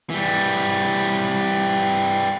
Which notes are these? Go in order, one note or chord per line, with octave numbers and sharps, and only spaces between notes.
E3 G3